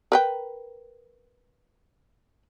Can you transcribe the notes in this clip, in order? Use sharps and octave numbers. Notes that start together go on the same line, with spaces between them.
A#4 B4 G5